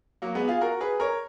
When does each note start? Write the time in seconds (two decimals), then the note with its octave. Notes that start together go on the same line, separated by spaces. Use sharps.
0.22 F#3 A#3
0.35 G#3 B3
0.48 F4 G#4
0.61 F#4 A#4
0.81 G#4 B4
1.00 A#4 C#5